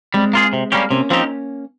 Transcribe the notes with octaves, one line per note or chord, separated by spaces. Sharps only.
G3 G#3 C4
A#3 F4 G#4
C3
G3 A#3 C#4 G4
C3 A#3 C#4
F3 C4 D#4 G4